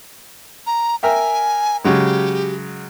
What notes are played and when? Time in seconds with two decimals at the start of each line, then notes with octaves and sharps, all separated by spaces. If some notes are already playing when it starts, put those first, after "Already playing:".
0.67 A#5
1.03 A#4 E5 G5 G#5
1.84 C#3 F#3 G#3 G4